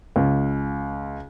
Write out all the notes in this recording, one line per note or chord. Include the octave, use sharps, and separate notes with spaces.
C#2